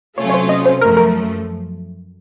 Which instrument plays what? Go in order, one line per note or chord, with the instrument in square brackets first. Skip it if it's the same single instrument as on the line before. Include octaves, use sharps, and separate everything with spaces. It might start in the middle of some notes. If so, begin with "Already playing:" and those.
[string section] C3 F#3 A3 C#4 F4 [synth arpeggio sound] C#5
[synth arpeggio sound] C#5
C5
D#5
C5
[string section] F#2 F3 A3 [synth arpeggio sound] A#4
[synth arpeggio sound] A#4